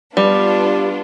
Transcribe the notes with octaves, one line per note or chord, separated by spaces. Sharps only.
G3 B3 D4 F4